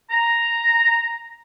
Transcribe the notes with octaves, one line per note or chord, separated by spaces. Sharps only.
A#5